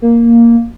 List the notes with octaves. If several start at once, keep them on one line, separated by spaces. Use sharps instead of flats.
A#3